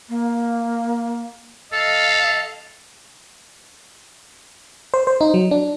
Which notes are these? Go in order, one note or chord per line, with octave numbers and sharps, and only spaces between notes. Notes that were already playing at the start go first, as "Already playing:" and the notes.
A#3
A4 D#5 F5
C5
C5
D#4
F#3
D4